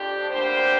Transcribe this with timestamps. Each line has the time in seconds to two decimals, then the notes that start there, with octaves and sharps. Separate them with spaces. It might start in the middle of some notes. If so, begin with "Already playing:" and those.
Already playing: F2 F3 D4 G4
0.30 D2 D3 G3 A#3 G4 C5